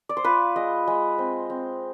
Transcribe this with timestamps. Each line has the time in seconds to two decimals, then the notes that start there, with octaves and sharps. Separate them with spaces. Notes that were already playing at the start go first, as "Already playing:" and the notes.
0.09 D5
0.17 C5
0.24 F4 B4
0.56 G#3 D#5
0.87 G#3
1.18 C4
1.50 C4